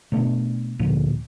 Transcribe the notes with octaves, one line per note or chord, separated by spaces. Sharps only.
B2 A3 D4
D2 A#2 F3